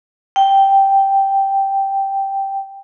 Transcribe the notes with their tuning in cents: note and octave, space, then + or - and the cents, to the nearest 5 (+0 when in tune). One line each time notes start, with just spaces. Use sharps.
G5 -5